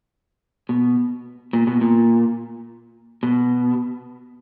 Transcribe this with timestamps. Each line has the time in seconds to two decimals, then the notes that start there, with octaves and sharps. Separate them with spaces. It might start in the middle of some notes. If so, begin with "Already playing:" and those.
0.69 B2
1.53 A#2
1.67 B2
1.81 A#2
3.23 B2